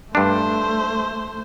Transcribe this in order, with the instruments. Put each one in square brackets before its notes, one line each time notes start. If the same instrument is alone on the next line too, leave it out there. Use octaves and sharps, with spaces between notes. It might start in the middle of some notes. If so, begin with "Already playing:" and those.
[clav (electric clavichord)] G2 D4 [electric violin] A3 C5